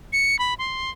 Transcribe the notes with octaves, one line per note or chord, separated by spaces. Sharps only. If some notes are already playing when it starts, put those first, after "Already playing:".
C#7
B5
C6